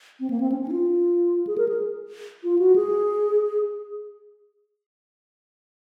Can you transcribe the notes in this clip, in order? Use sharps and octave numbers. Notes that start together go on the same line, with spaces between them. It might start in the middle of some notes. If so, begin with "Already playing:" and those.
C4
A#3
C4
C#4
C#4
D#4
F4
G#4
A#4
G#4
F4
F#4
G#4